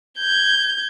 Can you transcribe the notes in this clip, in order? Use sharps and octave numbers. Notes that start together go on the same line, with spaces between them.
G6 G#6